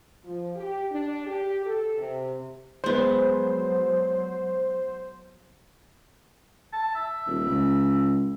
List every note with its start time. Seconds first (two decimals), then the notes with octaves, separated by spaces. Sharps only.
0.24 F3
0.56 G4
0.91 D4
1.26 G4
1.65 A4
1.98 C3
2.84 F#3 G#3 B3 C5
6.73 A5
6.95 E5
7.27 D#1
7.45 C#2